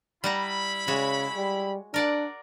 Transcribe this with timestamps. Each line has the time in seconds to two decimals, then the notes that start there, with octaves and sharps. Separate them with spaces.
0.24 G3 E4 F#5 A#5 B5
0.88 C#3 G#3 F#4 C#5
1.37 G3
1.94 D4 A#4 D5 F#5